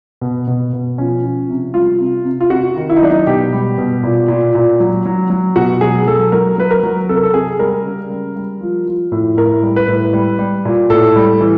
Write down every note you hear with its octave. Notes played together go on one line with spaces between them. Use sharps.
B2
B2
B2
F3 C#4
F3
C3
G3 F4
C3
C3
F4
C3 F#4
D#3
E4
D#4
F#3 D4
D#4
B2 G4
G3
B2
A#2
A#2
A#2
F#3
F#3
F#3
B2 F#4
F#3 G#4
F#3 A4
F#3 A#4
F#3 B4
A#4
F#3
C3 A4
A#4
A4
C3 G#4
G3 A#4
C#3
G3
G3
F3
F3
A2
A2 A#4
G3
B4
A2
G3
G3
A#2
A2 A4
G3
E3